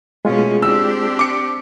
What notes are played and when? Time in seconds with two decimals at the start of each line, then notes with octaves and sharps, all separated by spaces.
0.25 B2 G#3 A3 C#4 F4 G#4
0.62 C4 D4 G4 E6
1.19 D6 C#7